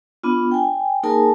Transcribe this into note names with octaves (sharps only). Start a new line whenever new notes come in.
B3 D4 F4
G5 G#5
A#3 D#4 G#4 A#4 G#5 A5